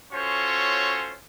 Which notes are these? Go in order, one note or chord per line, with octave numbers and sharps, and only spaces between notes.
C#4 F4 F#4 A4 C5 C#5